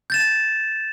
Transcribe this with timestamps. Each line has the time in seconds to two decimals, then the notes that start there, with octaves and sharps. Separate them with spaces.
0.10 G6 A6 E7